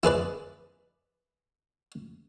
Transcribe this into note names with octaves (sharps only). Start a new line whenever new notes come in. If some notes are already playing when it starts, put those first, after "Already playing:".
E4 G#4 B4 D5